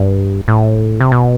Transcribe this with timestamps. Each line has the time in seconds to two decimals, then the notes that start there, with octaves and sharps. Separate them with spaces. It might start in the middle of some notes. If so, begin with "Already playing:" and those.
Already playing: G2
0.48 A2
1.00 C3
1.12 B2